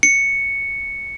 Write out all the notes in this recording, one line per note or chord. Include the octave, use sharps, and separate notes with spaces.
C#7